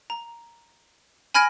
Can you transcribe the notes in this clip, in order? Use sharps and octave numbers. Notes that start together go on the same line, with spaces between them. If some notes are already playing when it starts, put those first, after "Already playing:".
A#5
G#5 B5 F6 G#6 A#6 D7